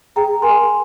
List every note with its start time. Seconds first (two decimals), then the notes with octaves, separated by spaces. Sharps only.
0.16 G#4 G5 A#5
0.42 A#4 G#5 C6